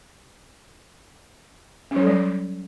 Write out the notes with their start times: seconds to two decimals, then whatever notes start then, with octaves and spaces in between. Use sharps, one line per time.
1.91 C#4
1.96 F#3
2.01 A4
2.07 G3